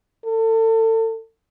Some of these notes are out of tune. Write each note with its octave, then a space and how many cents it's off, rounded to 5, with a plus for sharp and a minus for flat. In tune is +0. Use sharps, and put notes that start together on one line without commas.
A4 +35